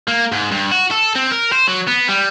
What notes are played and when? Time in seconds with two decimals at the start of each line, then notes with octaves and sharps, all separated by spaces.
0.08 A#3
0.32 G#2
0.52 G2
0.72 F#4
0.91 A4
1.15 C4
1.31 A#4
1.52 C5
1.68 F#3
1.87 B3
2.08 G3